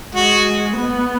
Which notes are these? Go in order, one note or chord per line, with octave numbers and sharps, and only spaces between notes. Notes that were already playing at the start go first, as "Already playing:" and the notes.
G#3 F#4
B3